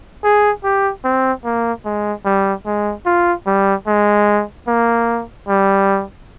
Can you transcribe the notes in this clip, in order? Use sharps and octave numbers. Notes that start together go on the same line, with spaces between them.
G#4
G4
C4
A#3
G#3
G3
G#3
F4
G3
G#3
A#3
G3